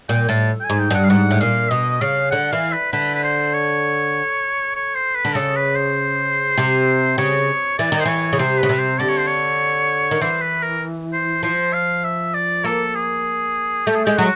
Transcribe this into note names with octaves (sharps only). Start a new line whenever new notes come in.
A#2 G5
A2 A5
G5
G#5
G#2
G5
G2 F#5
F5
G#2 F#5
A2
A#2 F5
B2 D#5
C#3 F5
D3 F#5
E3 F5
B4
D3 B4
B4
C5
C#5
C#5
C5
B4
D3
C#3 A4
B4
C5
C3
C#3 C#5
E3 D5
D#3
C5
E3 C#5
C#3
C3 C5
C#3 B4
C3
C5
D3 D5
C#5
C5
C#5
D#3
E3 C5
B4
A#4
C5
F3 C5
F5
E5
D5
A#3 A4
G#4
A3 G4
G#4
G#3 G4
F#3 F#4